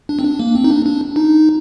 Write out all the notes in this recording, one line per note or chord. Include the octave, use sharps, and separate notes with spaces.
D4
C4
D4
A#3
C4
D#4
D4
D4
D#4